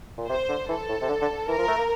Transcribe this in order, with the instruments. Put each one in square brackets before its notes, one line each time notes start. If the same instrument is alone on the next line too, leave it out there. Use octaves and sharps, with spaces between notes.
[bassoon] A#2
[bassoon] C3 [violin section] C5
[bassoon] D3
[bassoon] E3 [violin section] A4
[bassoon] A2
C3
D3
D3
[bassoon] E3 [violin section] A#4
[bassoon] F3
A3
A#3